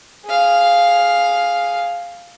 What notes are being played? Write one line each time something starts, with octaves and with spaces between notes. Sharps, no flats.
G#4 F5